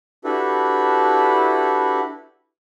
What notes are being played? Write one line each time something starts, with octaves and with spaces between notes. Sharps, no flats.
D4 E4 F#4 G4 A4 B4